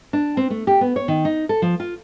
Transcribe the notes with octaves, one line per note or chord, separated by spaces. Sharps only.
D4
C4
A3
G4
B3
C#5
D#3
D#4
A4
F3
F4